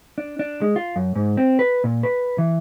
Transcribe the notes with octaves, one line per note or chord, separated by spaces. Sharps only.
D4
D4
G#3
F4
F#2
G#2
C4
B4
A#2
B4
E3